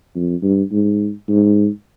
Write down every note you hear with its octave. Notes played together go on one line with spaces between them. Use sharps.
F2
G2
G#2
G#2